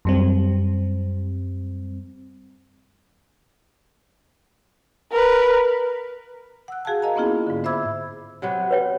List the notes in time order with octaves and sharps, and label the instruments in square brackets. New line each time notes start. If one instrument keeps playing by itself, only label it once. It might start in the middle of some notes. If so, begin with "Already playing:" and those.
[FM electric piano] F#2 G3 C4
[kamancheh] A#4 B4
[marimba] F#5 E6 F#6
F#4 G#4 F5 G#5 A5
A#4 D#5 F5 G#5 A#5
A#3 B3 C#4 E4 F4 G#4
G#2 D3
C5 E5 B5 D6 E6 G#6
[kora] C3 F#3 B3
[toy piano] B4 C#5 G5